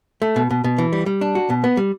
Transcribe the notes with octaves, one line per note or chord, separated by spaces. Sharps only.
A3
B2
B2
B2
E3
G3
G3
D4
F#4
B2
B3
G3